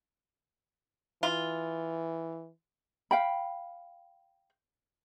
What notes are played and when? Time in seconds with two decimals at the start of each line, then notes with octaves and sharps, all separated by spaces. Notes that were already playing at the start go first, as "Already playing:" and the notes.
1.23 E3 F4
3.11 F5 G5 B5